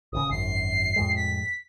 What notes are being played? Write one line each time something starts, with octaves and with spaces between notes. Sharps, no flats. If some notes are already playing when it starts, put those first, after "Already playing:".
D1 D2 C#3 D#6
G#1 F#2 C7
F2 A2 G#3
B6